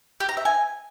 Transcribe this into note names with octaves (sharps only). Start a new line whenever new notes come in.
G4
A#5
E5
G#5